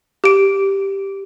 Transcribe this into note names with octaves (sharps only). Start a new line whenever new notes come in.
G4 D7